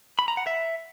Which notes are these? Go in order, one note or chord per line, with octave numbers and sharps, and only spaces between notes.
B5
A#5
F#5
E5